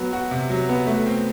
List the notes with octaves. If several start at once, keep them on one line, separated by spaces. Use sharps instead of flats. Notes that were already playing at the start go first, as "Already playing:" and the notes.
Already playing: F#3 B3
F#4
C3
F#3
B3
A3
C4